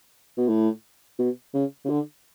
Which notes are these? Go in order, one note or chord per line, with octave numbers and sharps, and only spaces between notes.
B2
A2
B2
C#3
C#3
D3